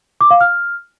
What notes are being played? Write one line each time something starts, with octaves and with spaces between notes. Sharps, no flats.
D6
F5
F6